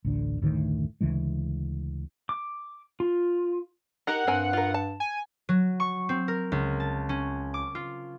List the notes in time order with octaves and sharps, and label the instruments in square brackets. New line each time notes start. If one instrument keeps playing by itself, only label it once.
[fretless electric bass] A1 D2 D3
F#1 D2 A2 D#3
D2 C#3 E3 G#3
[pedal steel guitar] D6
F4
[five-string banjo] D#4 G4 A#4 [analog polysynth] F#5
[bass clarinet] G2 [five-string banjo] C4 A#4 G#5
[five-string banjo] F4 A#4
A5
[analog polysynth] G#5
[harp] F#3
C#6
C4
A#4
C#2
A5
C#4
D6
F4